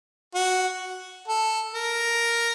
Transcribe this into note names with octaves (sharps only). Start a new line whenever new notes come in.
F#4
A4
A#4